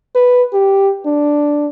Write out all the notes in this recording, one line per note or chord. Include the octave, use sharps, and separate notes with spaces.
B4
G4
D4